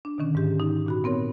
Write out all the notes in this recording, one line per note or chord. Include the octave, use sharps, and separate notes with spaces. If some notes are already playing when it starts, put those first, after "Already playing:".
D4
B2 D3 D#3 C#4
G#2 G4
D#4
A#2 F#4 B5
B3 C4 A#4 C#5